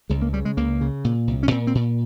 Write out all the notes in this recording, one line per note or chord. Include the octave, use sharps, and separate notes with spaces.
C#2 G#3
A#3
C#3 G3
G#3
C#2 A#3
C#3
A#2
C2
C#4
A#2 C4
C4
A#2